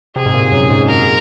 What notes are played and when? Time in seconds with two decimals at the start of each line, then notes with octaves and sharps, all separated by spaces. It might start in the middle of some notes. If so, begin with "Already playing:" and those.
0.16 C3 G#4
0.26 G#2
0.34 A#2
0.52 F#2
0.70 G#2
0.88 G#2 A#4